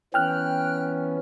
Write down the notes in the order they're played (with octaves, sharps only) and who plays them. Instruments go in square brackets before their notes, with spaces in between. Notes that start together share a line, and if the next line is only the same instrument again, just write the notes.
[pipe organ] E3 B3 C#4 [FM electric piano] G5 F6 F#6